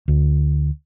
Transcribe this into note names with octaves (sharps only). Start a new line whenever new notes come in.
D2